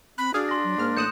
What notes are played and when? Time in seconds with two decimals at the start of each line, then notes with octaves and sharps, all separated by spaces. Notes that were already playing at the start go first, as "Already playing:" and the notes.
0.18 C4 B5 F#6
0.34 D4 F#4 G#4 F5
0.49 C6 A#6
0.64 F#3
0.78 G#2 A#3 F6
0.97 A1 D#6 F#6 G6 C#7 E7